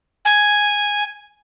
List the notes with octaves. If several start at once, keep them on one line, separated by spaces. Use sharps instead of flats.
G#5